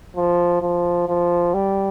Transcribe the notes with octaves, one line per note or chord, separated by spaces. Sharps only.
F3
F3
F3
G3